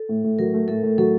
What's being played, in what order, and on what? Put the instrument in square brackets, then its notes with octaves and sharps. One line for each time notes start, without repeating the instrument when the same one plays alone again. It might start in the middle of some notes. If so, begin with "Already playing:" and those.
Already playing: [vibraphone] A4
[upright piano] A2
A2
[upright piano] F#3 [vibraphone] A#4
[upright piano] A3
[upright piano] A2 [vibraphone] A4
[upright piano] A2
[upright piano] F#3 [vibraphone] A4